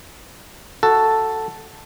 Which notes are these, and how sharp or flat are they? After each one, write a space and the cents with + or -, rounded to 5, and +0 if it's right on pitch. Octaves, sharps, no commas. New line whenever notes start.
F#4 +0 A4 +5